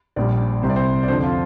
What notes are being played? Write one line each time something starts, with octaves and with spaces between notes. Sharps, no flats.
A#1 A#2 G3 D5
C2 C3 G3 C5
D5
C5
D5
F2 D3 F3 C5
F4